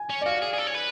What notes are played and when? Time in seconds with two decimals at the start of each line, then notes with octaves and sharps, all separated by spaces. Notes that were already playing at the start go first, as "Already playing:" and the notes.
Already playing: G#5
0.10 C#4
0.21 D5
0.26 F#4 F5
0.42 G#4
0.54 G#4
0.58 A4
0.67 C#5
0.75 B4